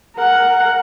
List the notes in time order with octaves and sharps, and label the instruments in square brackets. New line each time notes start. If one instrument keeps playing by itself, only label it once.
[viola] A#4 F#5